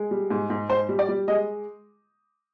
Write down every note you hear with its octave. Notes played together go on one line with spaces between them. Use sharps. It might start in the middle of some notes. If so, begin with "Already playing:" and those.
Already playing: G#3
G3
G#2
G#2
G#2 C5
G3
D5
G3
G#3 D#5